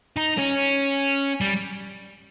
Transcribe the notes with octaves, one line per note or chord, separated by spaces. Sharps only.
D#4
C#4
G3